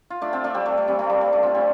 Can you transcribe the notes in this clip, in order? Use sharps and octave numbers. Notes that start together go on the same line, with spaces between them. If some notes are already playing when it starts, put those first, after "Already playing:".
F4
A3 D4
C4 F4
A3 D4
G3 C4
A3
A3
G3 C4
A3
G3
A3
A3 D4
C4 F4
G3 C4